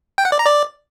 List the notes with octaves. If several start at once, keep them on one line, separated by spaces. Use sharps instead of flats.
G5
F#5
D5
A#5
D5